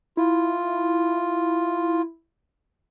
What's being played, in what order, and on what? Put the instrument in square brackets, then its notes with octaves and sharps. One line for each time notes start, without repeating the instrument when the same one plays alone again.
[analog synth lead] E4 [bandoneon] F4